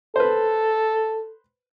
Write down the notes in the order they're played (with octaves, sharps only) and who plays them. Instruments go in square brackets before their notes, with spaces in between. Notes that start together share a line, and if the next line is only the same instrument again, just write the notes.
[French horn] A4 [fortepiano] B4 C5